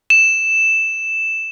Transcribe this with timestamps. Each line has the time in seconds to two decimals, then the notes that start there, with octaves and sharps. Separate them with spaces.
0.10 E7